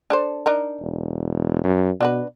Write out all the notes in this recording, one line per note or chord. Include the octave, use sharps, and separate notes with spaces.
D4 A4 C5
D4 D#4 A#4
E1
F#2
B2 D4 F#4 B4